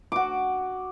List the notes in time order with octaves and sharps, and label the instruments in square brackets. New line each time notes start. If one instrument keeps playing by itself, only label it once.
[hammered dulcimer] F#4 D6